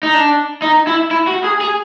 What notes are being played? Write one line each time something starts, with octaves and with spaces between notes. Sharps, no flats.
D#4
D4
D#4
E4
E4
F#4
G#4
G#4